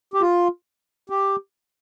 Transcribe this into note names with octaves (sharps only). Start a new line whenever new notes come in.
G4
F4
G4